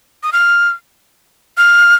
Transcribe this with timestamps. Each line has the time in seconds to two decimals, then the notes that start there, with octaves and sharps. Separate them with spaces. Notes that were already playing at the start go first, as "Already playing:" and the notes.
0.23 D#6
0.33 F6
1.57 F6